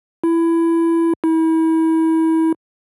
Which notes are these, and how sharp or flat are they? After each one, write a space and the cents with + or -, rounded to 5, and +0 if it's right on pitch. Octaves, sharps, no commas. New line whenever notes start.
E4 +15
E4 -35